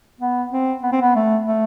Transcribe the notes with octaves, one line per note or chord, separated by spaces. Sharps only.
B3
C4
B3
C4
B3
A3
A3